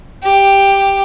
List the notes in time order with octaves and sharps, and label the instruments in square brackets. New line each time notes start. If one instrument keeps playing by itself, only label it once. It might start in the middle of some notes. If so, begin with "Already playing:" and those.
[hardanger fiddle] G4